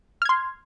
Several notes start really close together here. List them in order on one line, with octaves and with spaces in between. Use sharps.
F6 G#6 C6